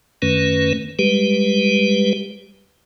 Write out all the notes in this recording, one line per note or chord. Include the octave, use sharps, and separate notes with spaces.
F#2 D#3 A3 C#4 B4
G3 G#3 G4 B4